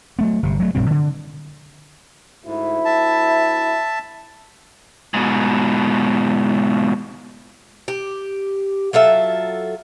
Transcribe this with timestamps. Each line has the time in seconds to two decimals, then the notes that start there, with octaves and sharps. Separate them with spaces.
0.19 F#3 A3 B3
0.43 G1 C3
0.60 F#3 A3
0.75 A#1 G2 B2 C4
0.91 D3
2.45 D2 G#2 E4
2.85 E5 A5
5.14 G#2 B2
7.88 G4
8.93 F#3 F4 A4 E5